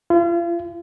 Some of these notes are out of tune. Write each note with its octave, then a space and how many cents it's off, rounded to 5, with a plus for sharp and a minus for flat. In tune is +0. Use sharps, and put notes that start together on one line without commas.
F4 -40